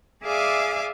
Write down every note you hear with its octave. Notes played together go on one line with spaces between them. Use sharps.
G#4 D5 E5 F5 G#5 D6